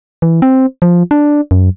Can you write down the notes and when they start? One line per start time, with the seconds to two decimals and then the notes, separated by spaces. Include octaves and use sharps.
0.22 E3
0.42 C4
0.82 F3
1.11 D4
1.51 F#2